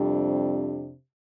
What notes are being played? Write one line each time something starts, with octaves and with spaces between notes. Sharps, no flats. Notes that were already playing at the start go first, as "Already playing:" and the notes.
Already playing: F2 C3 G3 D4